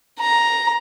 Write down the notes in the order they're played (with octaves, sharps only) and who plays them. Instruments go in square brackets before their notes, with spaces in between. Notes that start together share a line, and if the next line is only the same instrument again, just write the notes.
[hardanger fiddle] A#5